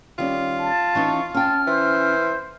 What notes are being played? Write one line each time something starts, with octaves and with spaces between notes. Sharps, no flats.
D#3 G3 C#4 F4
A5
E3 C#4 D#4 C#6
C#4 G5 A5 F6
E3 C5